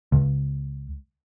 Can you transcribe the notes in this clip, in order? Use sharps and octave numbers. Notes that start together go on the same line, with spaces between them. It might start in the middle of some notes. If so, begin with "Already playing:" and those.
C#2